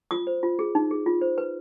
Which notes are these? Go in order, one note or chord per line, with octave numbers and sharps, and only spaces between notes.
F4 D#6
C5
F4
G#4
D#4
G#4
F4
C5
B4